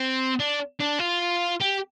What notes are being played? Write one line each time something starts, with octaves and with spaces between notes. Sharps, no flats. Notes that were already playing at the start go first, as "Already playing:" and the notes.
Already playing: C4
D4
D4
F4
G4